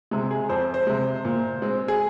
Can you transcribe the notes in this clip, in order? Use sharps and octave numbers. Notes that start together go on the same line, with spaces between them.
C3 G#3
G#4
F2 C5
C5
C3 G#3
A#2
G#3 C4
G#4